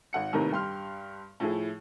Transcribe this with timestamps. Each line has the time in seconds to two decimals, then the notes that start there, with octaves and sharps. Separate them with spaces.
0.13 G#1 F#5 C#7
0.33 D#2 A2 C3 D#3 A#4 B4
0.51 G2 G4 C6 F6
1.40 A2 F3 E4 G#4